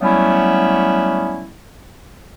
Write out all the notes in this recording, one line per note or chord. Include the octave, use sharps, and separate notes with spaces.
F#3 G3 A3 B3 C#4 E4